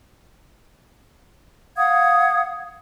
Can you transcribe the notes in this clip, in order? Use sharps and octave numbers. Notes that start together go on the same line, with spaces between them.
F5 F#5 D#6 G#6